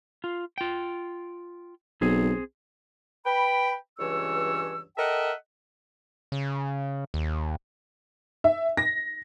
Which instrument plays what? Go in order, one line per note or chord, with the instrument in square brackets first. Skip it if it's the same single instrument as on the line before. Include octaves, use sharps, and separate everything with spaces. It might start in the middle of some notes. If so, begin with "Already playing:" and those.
[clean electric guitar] F4
F4 G5
[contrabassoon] B1 [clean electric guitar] C4 G#4
[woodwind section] B4 G5 B5
C#2 G2 E3 C#5 E6
A4 A#4 D#5 E5 F#5 G5
[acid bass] C#3
D#2
[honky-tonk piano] E5
A#6